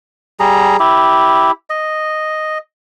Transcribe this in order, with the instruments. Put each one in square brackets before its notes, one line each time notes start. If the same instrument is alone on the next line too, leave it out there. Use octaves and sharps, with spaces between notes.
[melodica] G3 G#4 A#5
E4 G4
D#5